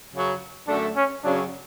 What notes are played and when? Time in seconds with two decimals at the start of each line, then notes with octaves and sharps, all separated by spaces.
0.12 F#2 C#3 F#3
0.68 F#2 D3 A3 D4
0.96 C#4
1.24 F#2 C#3 F#3 D4